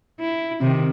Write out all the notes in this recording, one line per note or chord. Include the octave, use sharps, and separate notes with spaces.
E4
C3 D#3